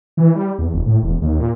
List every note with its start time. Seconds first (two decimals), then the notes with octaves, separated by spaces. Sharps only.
0.17 E3
0.35 G3
0.59 E2
0.74 F1
0.86 A2
1.03 E1
1.22 D#2
1.40 A#2